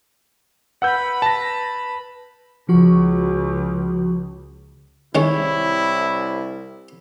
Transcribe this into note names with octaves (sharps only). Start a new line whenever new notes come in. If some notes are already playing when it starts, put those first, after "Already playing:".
B4 F#5 B5 E6 G6
A5 A#6
C#2 F3 F#4 C#6
C2 D#3 G#3 C#4 E4 C#5